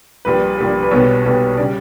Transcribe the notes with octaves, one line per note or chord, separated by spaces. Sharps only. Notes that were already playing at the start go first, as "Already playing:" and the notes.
A#1 A#2 G3 B4
A#1 A#2 G3
B4
B1 B2 G3 B3 C#5
B1 B2 G3 B3
C#3 G3 D5